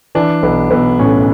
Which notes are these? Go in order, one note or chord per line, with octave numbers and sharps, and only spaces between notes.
E3 D4
B1 B3
B1 B3
A2 C#4